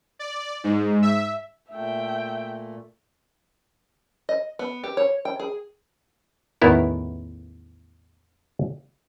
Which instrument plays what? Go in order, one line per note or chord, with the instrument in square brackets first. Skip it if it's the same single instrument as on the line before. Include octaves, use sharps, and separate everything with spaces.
[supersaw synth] D5
G#2
E5
[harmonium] A#2 A3 [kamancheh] E5 G5
[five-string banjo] D#5
B3
G4
C#5
G5
G#4
[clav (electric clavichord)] A1 E2 D#3 B3 E4 A#4